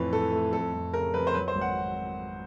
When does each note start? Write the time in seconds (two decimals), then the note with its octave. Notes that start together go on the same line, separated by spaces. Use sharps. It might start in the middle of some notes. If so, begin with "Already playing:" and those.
Already playing: F2 A2 E3 B4
0.13 A2 A4
0.32 A3
0.53 F2 A4
0.73 F2
0.93 C#3 A#4
1.14 F2 B4
1.27 C5
1.34 F#3 B4
1.48 C5
1.55 G#1
1.61 F#5